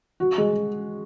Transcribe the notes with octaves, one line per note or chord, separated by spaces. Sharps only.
F#4
G#3